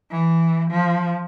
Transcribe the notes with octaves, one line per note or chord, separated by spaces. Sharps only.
E3
F3